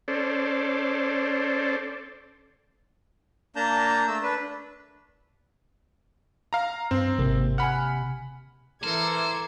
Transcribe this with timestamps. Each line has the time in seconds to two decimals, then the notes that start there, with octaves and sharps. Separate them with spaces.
0.08 C#4 A4 C5 D5
3.56 A#3 D4 A5 A#5 G6
4.08 A3 E6
4.23 D4 B4
6.53 F5 A#5
6.91 G2 C4
7.19 G#1 C3 A#3
7.58 F#5 G#5 B5 F6
8.84 E3 A4 A#4 C5 A#5 D6 G#6